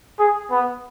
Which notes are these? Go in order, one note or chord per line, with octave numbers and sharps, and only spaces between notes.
G#4
B3